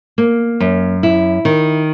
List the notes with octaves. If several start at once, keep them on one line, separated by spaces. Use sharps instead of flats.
A#3
F#2
E4
D#3